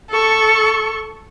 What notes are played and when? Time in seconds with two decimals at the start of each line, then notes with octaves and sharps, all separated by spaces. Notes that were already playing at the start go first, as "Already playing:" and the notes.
0.10 A4 C#6